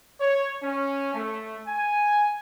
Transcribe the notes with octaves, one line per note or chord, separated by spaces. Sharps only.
C#5
C#4
A3
G#5